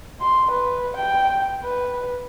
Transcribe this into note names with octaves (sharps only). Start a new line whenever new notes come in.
C6
B4
G5
B4